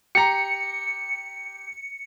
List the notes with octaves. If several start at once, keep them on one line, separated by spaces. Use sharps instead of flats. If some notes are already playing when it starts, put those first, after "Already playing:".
G4 A#5 C#7